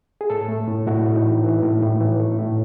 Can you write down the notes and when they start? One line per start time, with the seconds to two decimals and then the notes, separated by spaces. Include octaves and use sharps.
0.21 G#4
0.30 A2 A4
0.48 A3
0.68 A2
0.87 A2 F#4
1.06 A2
1.15 D#4
1.24 E3
1.44 E3
1.62 A2
1.83 A2
2.00 E3
2.20 A3
2.39 A2